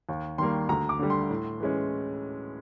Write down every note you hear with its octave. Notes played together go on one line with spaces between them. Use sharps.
D#2
D#3 G3 A#3 C6
D2 A#5
D6
D3 G3
C6
A2
E3 G#3 C#4